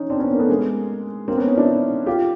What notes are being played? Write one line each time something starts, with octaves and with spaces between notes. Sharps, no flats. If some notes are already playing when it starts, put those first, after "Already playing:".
Already playing: C#4 D#4
C4 D4
B3 C#4
A#3
A3 B3
G#3 A#3
A#3 C4
B3 C#4
C#4 D#4
D4 E4
F4 G4